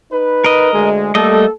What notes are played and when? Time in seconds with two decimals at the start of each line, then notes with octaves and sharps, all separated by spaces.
0.12 D#4 B4
0.44 A#4 D#5
0.74 D2 G#3
1.15 G3 A3 A#3 A4 D#5